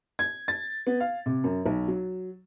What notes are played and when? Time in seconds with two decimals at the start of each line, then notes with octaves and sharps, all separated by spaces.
0.19 G#6
0.48 A6
0.87 B3
1.00 F5
1.26 C3
1.44 F#2
1.66 B1
1.88 F#3